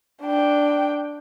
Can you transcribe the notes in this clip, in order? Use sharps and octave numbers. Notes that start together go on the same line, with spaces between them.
D4 G5